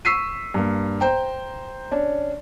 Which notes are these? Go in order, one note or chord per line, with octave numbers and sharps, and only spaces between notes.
C#6 E6 B6 C7 D#7
G2 A#3
C5 G5 A#5
C#4 D4